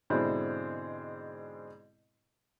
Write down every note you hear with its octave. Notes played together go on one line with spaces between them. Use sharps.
G#2 B2 D3 C4 D4 E4